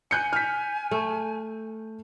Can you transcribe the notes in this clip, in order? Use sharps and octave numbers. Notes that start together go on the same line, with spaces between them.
G#5 F#6 G6 C#7
F6 B6
A3